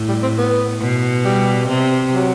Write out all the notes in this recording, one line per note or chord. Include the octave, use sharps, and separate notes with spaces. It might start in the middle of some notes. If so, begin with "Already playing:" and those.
Already playing: A2
G3
C4
B3
B2
G3
C3
F#3